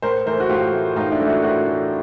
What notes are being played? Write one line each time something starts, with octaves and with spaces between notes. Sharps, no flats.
A2 A#4 C5
E3 A3 A#4 C5
F#4
A2 F4 G4
E3 A3
A2 D#4 F4
D4 E4
E3 A3
E4 F#4
A2 E4 F#4
E3 A3